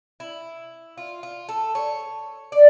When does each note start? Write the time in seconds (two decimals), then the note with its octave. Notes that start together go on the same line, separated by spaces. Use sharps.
0.20 E4
0.98 F4
1.23 F4
1.49 A4
1.75 C#5
2.52 D5